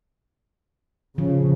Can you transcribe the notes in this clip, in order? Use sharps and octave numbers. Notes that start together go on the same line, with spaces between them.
C#3 F3